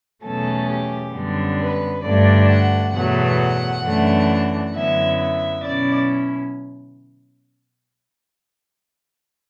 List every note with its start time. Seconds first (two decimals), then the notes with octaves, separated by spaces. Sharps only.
0.24 E2 B2 F#3 A3 C#4 A4
0.69 G4
1.13 F#2 D3 G3 B3 D4
1.59 B4
2.03 G2 D3 A3 D4 D5
2.49 F#5
2.93 E2 B2 F#3 A3 F#5
3.84 F#2 E3 A3 D4
4.74 F#2 D3 F#3 B3 E4 E5
5.19 E5
5.64 B2 F#3 C#4 E4 D5